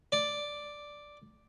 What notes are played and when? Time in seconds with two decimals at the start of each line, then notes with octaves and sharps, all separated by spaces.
0.12 D5